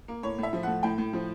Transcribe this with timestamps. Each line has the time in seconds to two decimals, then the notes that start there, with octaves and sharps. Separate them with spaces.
0.08 A#3
0.23 A2 C#5
0.38 A2 E5
0.53 F3
0.63 A3 F#5
0.83 A2 G5
0.98 A2
1.13 F3